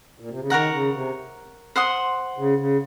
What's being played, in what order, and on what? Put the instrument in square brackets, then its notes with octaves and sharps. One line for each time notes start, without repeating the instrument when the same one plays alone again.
[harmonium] A#2
C3
C#3
[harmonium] D#3 [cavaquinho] A#4 C#5 F#5 A#5
[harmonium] C#3
C3
[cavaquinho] C5 F#5 C6 D#6
[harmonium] C#3
C#3